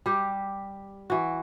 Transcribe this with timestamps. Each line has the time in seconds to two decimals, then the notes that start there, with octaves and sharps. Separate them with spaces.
0.06 G3 G4
1.10 E3 F#4